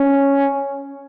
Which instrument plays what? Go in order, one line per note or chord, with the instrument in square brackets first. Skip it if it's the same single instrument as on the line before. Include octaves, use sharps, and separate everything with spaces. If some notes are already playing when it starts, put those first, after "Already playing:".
Already playing: [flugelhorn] C#4